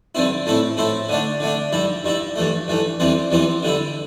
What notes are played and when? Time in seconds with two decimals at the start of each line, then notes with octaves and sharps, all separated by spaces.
0.15 G2 D3 C4 E4
0.46 A2 A3 C4 E4
0.77 A2 A3 C4 E4
1.09 D3 A3 D4
1.40 D3 A3 D4
1.72 G2 G3 E4
2.04 G2 G3 E4
2.36 G2 E3 A3
2.68 G2 E3 A3
3.00 E2 E3 G3 C4
3.31 E2 E3 G3 C4
3.63 D3 G3 E4